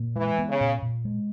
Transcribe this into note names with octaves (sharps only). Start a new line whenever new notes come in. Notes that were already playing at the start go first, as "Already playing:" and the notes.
Already playing: A#2
E3 G#3
B3
C#3
A#2
A#2
G#3